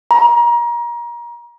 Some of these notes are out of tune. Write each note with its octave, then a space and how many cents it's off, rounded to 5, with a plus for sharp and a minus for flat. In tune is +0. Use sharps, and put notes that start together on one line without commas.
A#5 +30